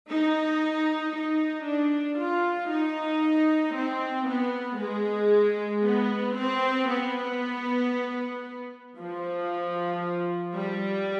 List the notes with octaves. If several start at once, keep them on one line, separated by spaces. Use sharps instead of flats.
D#4
D#4
D4
F4
D#4
C4
B3
G#3
B3
C4
B3
F3
G3